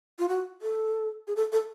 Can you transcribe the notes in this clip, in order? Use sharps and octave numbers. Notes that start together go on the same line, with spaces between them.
F4
F#4
A4
G#4
A4
A4